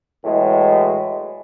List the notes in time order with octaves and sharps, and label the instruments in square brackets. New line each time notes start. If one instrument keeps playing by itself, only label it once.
[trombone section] E2 A2 F#3 G#3